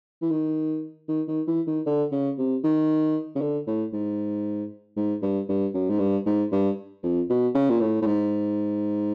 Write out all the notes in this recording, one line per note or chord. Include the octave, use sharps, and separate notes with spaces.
E3
D#3
D#3
D#3
E3
D#3
D3
C#3
C3
D#3
C#3
D3
A2
G#2
G#2
G2
G2
F#2
G#2
G2
G#2
G2
F2
B2
C#3
A#2
A2
A2
G#2